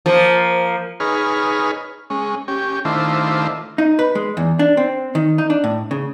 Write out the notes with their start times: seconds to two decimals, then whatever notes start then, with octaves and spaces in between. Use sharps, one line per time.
0.06 F3 A#3
1.00 D#4 G#4 B4 C#5 F6
2.10 G#3 C#4
2.48 C#4 G4
2.85 D#3 A3 D4 E4 F4 C5
3.78 D#4
3.99 B4
4.15 G#3
4.37 E2
4.59 D4
4.77 C4
5.15 D#3
5.38 D#4
5.50 D4
5.64 A2
5.91 C#3